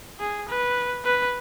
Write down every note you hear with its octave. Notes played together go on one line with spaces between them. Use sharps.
G#4
B4
B4